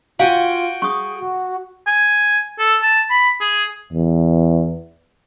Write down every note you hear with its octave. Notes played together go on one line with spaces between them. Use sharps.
F4 F#4 F5 G5 G#5
G#4 C#6 D#6
F#4
G#5
A4
A5
B5
G#4
E2